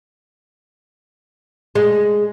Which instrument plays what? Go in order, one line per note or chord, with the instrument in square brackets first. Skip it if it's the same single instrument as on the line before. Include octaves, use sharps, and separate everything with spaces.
[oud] G#3